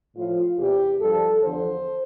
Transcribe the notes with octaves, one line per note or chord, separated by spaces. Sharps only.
A2 F3 F4
E2 C3 E3 G4
G2 F3 A4
E2 D3 F3 C5